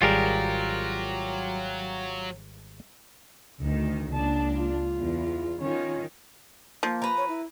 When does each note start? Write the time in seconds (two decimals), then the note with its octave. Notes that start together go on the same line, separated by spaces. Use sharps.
0.02 G#1 F#3 G3 F4 G4 G#4 A#4
3.61 D2 D#3
4.14 C#2 A#3 D4 A5
4.55 F4
4.96 E2
5.61 D#3 C#4 F4
6.83 F3 A#3
7.02 B4 A#5
7.17 C#5
7.28 E4